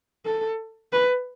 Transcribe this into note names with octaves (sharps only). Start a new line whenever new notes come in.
A4
B4